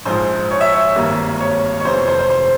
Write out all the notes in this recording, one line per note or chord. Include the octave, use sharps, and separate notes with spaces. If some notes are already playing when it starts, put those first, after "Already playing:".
A#1 G#2 F3 G#3 C5
C#5
E5
C#5
G#1 G2 G3 A#3
C#5
C#5
F1 F2 C3 E3 C5
C5
C5
C5